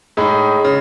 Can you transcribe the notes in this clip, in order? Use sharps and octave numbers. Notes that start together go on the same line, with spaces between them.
A2 G#3 D#4 G#4
C#3